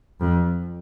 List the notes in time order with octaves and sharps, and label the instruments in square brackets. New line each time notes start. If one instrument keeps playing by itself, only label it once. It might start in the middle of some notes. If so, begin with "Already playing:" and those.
[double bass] F2